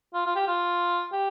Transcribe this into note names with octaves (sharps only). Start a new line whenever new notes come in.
F4
F4
G4
F4
G4